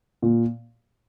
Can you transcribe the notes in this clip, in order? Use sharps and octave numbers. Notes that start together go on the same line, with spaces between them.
A#2